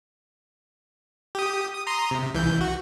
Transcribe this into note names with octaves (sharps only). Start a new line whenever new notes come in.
G4 D#6
D#6
A#5 C6 D#6
C3
C2 E3 G6
F#4